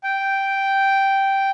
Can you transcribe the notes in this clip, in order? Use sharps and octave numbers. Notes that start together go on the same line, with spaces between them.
G5